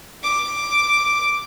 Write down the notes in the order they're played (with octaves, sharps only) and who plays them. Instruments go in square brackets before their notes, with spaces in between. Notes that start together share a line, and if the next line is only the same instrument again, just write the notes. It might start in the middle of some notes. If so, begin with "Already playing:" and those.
[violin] D6